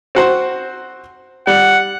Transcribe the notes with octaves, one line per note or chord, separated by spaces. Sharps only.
C4 F#4 C5
G3 F#5